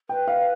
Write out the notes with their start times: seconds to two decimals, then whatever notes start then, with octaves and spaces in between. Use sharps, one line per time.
0.09 B4 G5
0.28 F5